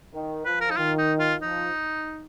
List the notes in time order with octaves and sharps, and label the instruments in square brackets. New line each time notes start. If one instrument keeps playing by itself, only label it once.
[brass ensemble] D#3
[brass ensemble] F3 [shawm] B4
[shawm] A#4
D#4
[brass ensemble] D#3 [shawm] F4
[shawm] D#4
F4
[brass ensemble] F3 [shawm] D#4